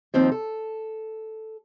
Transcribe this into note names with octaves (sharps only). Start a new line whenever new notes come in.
D#2 F3 C4 D#4
A4